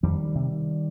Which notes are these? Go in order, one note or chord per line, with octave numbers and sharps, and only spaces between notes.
F2 D#3 G3
C3